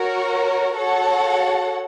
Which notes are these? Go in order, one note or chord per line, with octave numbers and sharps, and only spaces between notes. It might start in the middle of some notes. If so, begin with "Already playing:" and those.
Already playing: F#4 A#4 C#5
F#4 A4 C#5 F#5